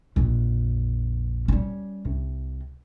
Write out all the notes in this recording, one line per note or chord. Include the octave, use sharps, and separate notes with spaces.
A#1 F2
G3 C#4
C2